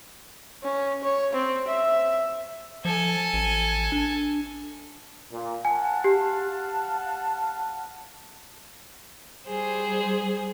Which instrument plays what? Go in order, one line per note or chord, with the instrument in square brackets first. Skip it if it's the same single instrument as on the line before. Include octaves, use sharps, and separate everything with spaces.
[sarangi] C#4
C#5
C4
E5
[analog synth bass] F3 [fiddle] A4 G#5
[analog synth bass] A1
D4
[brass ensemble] A#2
[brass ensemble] F5 F#5 A5 [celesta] G#5
[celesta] G4
[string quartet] G3 G#4 C5